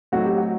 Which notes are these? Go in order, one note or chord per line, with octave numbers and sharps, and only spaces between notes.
A2 F#3 A3 C4 D#4 F#4
G4
F#4